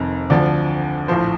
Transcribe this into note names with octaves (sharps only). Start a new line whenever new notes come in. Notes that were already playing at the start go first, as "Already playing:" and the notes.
Already playing: F1 F2 D#3
D2 D3 F3 D5
A#1 A2 F3 C5